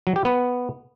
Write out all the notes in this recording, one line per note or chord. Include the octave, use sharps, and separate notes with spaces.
F#3
G4
B3